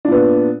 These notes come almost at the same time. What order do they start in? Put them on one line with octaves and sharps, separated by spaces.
D4 A#2 B3